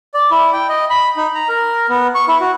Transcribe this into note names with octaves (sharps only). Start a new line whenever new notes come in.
D5
E4
G5
D#5
B5
D#4
A#5
A#4
B3
C#6
E4
F#4